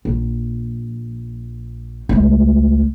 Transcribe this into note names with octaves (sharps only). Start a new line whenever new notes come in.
A#1
C#2 A3